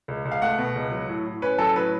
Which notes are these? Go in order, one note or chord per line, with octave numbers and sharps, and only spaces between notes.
C#2
C#2
F5
A3 F#5
B2
C#2
F#3
A2
A2
C#4 B4
F#3 A4
A2 B4